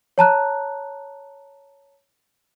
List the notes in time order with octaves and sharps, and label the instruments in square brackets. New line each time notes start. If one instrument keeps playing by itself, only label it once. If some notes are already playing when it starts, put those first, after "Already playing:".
[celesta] C#5 A5 A#5 F#6